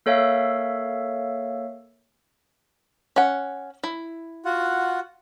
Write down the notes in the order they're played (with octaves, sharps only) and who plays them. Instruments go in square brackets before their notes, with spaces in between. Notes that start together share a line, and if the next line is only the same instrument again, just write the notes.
[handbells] A#3 A4 C#5 E5 F5
[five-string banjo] C#4 F#5
E4
[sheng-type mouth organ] F4 F#4 F#5